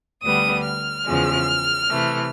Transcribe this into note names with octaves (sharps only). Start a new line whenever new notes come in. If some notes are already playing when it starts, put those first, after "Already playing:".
D2 D3 G3 B3 D#6
F6
E2 C#3 F3 G#3
C3 E3 A3